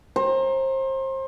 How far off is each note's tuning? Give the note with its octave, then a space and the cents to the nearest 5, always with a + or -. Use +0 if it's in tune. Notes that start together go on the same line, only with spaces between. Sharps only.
C5 +30 A#5 +0